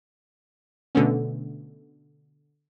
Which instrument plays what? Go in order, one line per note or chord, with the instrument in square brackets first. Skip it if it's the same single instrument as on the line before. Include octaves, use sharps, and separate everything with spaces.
[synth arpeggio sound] B2 D3 A3 B3 C#4